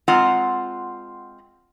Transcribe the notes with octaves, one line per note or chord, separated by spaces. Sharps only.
G#3 C4 F4 F#5 A#5